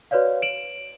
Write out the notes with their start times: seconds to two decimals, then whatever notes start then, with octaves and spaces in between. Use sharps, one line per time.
0.11 F#4 B4 C#5 D5 F5
0.42 D7 E7 F#7